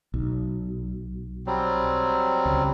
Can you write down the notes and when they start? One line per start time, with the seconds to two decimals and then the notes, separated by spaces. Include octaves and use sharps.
0.14 B1
1.47 F#3 G3 C4
2.46 C#2